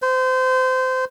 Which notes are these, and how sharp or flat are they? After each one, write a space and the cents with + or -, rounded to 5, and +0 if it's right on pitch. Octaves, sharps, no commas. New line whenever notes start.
C5 -25